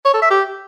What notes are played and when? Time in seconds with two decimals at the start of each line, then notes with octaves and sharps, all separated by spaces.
0.05 C#5
0.14 A4
0.22 E5
0.31 G4